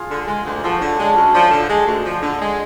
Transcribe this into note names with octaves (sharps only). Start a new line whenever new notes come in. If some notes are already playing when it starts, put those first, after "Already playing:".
Already playing: F4 G#4
D3
G#3
D2
F3 F#4 A4
D3 A4 C#5
G#3 D4
D2 C#4
F3 D4
D3
G#3
D2
F3
D3
G#3